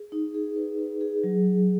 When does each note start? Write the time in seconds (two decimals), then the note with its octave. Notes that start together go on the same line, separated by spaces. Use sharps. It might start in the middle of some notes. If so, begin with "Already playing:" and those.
Already playing: G#4
0.12 D#4
0.34 G#4
0.56 B4
0.79 B4
1.01 G#4
1.24 F#3
1.45 F#3